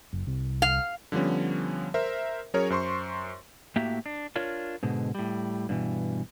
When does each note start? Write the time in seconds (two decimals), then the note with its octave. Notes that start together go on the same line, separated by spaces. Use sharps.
0.13 F#1
0.27 C2
0.62 F5
1.12 D3 F3 G3 B3 C#4
1.94 A#4 C5 E5
2.54 F#3 C#4 G#4 A#4 C#5
2.70 F#2 C5 C6 C#6
3.76 A2 A#3 F#4 G4 E5 A#5
4.06 D4
4.36 D4 F4 A#4 C#5
4.83 G#2 B2 D3
5.15 A2 G3
5.69 G2 B2 E3